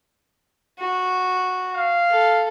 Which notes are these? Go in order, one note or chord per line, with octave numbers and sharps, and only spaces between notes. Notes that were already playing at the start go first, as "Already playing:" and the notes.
F#4
F5
A4